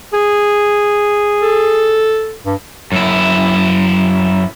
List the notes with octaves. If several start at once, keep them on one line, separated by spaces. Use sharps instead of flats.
G#4
A4
G2
F#2 E4